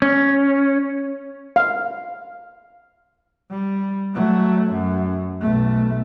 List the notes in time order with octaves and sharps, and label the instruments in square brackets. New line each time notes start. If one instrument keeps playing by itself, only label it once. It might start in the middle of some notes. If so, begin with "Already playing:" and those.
[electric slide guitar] C#4
[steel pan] F5
[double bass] G3
F#3 A3
F#2
B1 A3